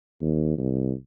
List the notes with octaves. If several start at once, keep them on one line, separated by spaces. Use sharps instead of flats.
D#2
C2